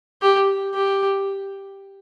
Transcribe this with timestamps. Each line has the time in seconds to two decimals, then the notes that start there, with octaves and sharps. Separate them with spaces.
0.22 G4
0.74 G4